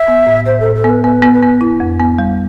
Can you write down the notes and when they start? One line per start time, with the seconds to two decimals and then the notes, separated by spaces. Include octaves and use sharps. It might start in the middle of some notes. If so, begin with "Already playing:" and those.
Already playing: E5
0.08 B3
0.27 A2
0.46 A2 C5
0.60 A4
0.66 A2
0.75 A4
0.84 B3
0.90 B4
1.04 B3 B4
1.22 B3
1.32 B4
1.43 B3
1.61 E4
1.80 F2
2.00 B3
2.19 G3